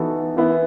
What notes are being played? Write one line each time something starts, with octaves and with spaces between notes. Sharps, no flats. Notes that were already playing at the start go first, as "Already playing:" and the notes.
Already playing: E3 B3 D#4 F#4 A4
E3 B3 E4